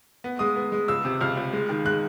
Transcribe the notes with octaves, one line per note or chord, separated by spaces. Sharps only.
B3
G#3 D#6
B3
G#3
C#2 E6
C3
C#2 F6
C#2
G#3
D#3
G#3 F#6